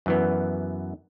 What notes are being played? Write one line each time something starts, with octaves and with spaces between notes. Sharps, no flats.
F#2 E3 B3